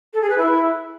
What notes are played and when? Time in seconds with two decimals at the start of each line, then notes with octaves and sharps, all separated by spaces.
0.13 A4
0.22 G#4
0.30 B4
0.38 E4